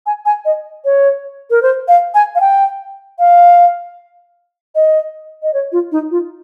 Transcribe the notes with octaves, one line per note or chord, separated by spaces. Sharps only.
G#5
G#5
D#5
C#5
A#4
C5
F5
G#5
F5
G5
F5
D#5
D#5
C#5
F4
D#4
F4